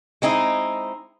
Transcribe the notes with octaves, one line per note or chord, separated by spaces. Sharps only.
G#3 C4 D#4 E4